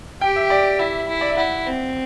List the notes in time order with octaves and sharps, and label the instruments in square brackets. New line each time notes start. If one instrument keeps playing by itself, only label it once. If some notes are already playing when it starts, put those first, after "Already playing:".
[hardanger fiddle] G4 [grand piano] G5
[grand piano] E5
D5
[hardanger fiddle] E4 [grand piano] E5
[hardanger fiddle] E4
[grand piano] D5
E5
[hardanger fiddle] E4 [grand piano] F#5
[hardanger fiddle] C4